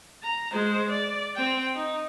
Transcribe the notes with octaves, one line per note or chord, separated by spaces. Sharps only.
A#5
G#3 C5
D5
C4 G5
D#4